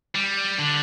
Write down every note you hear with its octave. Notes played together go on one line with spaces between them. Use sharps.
G3
D3